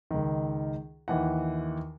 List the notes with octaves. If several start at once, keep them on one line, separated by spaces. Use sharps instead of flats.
C#2 D#3
D#2 E3 F#5